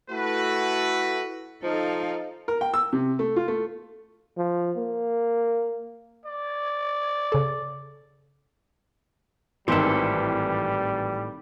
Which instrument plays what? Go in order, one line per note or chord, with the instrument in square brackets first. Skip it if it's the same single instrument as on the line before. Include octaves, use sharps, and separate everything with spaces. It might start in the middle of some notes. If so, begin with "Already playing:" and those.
[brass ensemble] A3 E4 F#4 B4
[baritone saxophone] F3 [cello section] D#4 A4 F5
[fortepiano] A#4
G5
E6
C3
A3
F4
A3
[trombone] F3
A#3
[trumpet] D5
[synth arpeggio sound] C#3 A4
[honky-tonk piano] G#1 E3 [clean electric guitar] A2 G4 A4 [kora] D#3 C4 [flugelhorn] G3